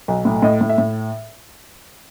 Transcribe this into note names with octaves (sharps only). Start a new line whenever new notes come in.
B1
A2
A2 D#5
A2
E5
A2